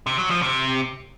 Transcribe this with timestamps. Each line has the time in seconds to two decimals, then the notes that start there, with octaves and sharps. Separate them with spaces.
0.07 C3
0.18 F#3
0.30 F3
0.42 C3